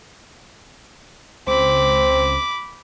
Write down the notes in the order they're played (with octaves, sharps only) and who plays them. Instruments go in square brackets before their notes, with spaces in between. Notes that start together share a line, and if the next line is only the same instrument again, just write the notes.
[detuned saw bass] C#2 [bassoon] C4 [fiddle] B5 D6